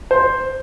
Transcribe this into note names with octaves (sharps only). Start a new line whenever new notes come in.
C5